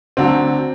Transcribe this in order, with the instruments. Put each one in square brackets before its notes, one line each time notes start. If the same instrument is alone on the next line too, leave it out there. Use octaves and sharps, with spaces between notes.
[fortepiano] D2 D3 F#3 [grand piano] C4